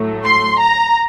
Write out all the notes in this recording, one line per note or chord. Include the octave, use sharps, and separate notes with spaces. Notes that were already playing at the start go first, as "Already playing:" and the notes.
Already playing: A2 F#3 A3
C6
A#5